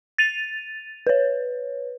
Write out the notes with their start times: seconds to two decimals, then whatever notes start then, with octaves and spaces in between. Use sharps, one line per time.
0.18 A6 D#7 F7
1.07 B4 C#5